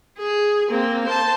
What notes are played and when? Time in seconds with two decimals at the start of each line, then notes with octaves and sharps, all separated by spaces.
0.18 G#4
0.70 A#3 C4
1.05 C5 A5